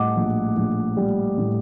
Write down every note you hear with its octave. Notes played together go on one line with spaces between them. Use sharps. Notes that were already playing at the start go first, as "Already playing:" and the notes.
Already playing: A2 G3 D#5 F#5 D6
A#1
A#1
G3
A2